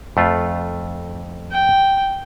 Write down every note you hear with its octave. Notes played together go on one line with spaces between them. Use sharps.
F2 A3 F4
G5